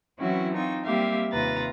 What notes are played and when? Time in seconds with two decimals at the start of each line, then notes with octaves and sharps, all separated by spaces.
0.20 E3 F#3 C4 C#4 E4 F#4
0.54 C4 D#4 F4 C#6
0.85 G3 A#3 C4 G4 E5 F5
1.32 D#2 C3 F4 B4 A#5 A6